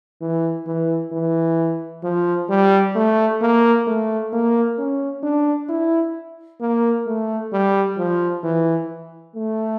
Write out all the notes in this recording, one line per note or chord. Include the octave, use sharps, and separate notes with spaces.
E3
E3
E3
F3
G3
A3
A#3
A3
A#3
C#4
D4
E4
A#3
A3
G3
F3
E3
A3